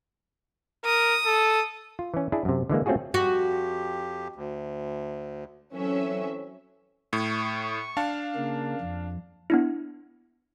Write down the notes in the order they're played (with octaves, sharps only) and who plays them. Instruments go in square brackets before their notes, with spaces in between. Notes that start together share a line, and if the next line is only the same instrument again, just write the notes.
[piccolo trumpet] A#4 [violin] D#6
[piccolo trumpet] A4
[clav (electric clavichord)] F4
E3 C#4
D4 E4 G#4
F#2 C3
D3 E3 G#3 A#3
A3 C4 C#4 F4 F#4 G#4
[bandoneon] F2 G4 [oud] F#4
[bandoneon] D2
[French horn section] E3 C4 A4 [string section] F#3 C#4 E5
[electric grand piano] A2 [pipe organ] C#6
[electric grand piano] D4 F5 A5
[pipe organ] C#3 A#3
F2
[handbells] B3 D4 E4